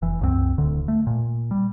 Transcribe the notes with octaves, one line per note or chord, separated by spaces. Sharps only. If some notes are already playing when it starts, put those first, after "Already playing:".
F1 E3
C2 F#2 G#3 C4
D1 D2 D3
A3
A#2
G3